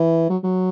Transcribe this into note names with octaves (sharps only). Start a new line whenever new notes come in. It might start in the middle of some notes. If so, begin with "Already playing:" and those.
Already playing: E3
F#3
F#3